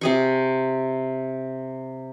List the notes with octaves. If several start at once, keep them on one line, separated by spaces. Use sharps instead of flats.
C3 G#4 C#6